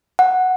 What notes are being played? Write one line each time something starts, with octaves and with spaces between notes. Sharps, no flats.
F#5